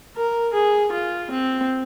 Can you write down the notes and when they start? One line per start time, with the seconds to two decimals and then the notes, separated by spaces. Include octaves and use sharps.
0.16 A#4
0.53 G#4
0.92 F4
1.30 C4